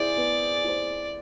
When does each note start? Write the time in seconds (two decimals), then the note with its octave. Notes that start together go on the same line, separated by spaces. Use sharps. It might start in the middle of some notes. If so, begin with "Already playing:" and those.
Already playing: E4 G#4 C5 D5
0.17 B3
0.64 E4 G#4 C5